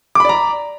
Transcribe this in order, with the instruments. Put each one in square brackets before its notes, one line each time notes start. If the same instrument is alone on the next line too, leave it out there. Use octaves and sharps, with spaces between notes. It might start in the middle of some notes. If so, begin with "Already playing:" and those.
[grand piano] D6
B5
D5
A#5